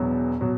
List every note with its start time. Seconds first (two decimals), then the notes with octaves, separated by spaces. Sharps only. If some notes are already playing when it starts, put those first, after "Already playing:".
Already playing: E1 E2 B2 F#3
0.41 B2 F#3